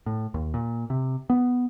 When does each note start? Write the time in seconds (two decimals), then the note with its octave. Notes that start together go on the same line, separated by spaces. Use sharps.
0.06 A2
0.34 D#2
0.54 A#2
0.90 C3
1.30 B3